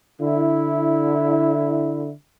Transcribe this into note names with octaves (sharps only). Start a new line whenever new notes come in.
D3 E4